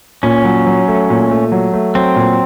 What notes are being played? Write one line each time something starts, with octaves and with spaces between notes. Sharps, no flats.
A#2 C#4
F#3
F#3
A3
A#2
A3
F#3
A3
F#3 C4
A#2